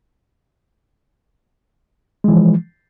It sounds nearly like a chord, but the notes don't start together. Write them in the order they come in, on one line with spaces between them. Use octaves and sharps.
G#3 E3 F3